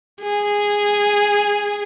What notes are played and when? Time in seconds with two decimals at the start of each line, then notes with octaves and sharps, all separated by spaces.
0.22 G#4